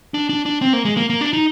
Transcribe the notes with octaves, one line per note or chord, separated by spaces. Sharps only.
D4
D4
D4
C4
A#3
G#3
A#3
A#3
D4
D#4